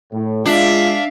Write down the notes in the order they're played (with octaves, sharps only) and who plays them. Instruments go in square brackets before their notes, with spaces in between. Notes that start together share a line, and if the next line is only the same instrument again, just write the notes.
[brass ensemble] A2
[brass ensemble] G#3 [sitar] D4 [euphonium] F4 [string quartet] E5 F5